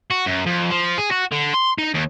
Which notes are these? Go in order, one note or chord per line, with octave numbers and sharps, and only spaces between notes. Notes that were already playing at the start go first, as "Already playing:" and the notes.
F#4
F#2
F2
F3
G#4
F#4
D3
C6
D#4
D#2